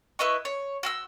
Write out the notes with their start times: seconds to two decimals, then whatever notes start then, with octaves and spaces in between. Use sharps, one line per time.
0.19 E4 B4 D#5 C#6
0.45 C#5
0.83 F#4 C6 E6